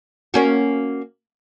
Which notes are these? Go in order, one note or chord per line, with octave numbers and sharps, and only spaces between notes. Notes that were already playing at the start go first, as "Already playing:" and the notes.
A#3 C#4 F#4